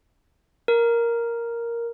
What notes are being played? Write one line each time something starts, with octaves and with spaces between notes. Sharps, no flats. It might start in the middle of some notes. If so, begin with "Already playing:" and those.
A#4